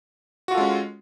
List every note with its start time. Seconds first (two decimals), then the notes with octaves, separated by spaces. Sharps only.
0.48 F#4
0.51 F4
0.54 A4
0.58 G#3
0.61 C#4